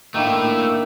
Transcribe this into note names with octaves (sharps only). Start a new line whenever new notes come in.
D#3 A3 A#3 D4 E4